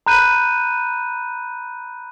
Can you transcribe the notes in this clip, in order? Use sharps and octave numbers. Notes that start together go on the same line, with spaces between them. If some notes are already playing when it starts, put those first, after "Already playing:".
A#5 B5 F#6 G6 D#7